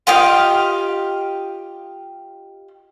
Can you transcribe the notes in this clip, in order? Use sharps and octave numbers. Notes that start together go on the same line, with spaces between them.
F4 G4 D#5 F5